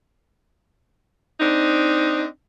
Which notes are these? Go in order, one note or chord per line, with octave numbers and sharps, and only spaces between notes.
C4 D4 D#4